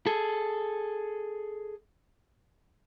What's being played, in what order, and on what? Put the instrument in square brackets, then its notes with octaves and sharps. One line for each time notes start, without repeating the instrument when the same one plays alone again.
[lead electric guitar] G#4 A4